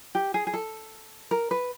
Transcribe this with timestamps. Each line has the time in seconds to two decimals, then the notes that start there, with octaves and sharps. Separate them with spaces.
0.15 G4
0.34 G#4
0.47 G#4
0.54 A4
1.31 A#4
1.51 B4